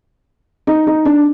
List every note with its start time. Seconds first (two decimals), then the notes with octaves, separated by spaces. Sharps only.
0.67 D#4
0.87 D#4
1.05 D4